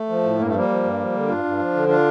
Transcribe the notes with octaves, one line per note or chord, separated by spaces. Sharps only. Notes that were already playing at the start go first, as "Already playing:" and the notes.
Already playing: A3
F3
A2
G2 A#3
A3
F3 G3 A#3
F3
G2
F3
D3
G2 D4 F4
G2
F3
D3
D4 F4